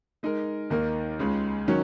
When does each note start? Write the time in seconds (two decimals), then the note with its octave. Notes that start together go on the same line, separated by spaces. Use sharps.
0.23 G#3 D#4 A#4
0.70 D#2 D#3 A#3 D#4 A#4
1.19 C#2 C#3 G#3
1.68 D#3 F#3 C#4